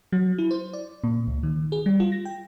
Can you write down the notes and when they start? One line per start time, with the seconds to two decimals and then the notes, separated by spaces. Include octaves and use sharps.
0.12 F#3
0.38 E4
0.51 C5
0.73 D5
1.04 A#2
1.27 C#2
1.43 D#3
1.72 G#4
1.86 G3
2.00 F4
2.12 A#6
2.25 G5